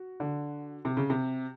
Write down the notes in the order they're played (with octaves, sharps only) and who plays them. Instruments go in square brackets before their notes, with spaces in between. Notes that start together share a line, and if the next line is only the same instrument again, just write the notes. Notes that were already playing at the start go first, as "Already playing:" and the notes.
Already playing: [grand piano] F#4
[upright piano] D3
C3
C#3
C3